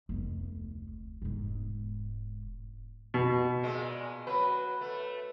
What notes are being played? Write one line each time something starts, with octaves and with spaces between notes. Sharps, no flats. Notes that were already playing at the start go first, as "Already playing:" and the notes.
F1 D2
E1 G#2
B2
A#2 G#3
F#3 B4
A3